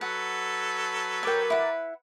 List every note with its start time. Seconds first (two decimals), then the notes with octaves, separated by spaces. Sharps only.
0.01 F#3 A4 B4 F#5
1.23 A#4 C#5 G5 D6 A6
1.50 E4 F#5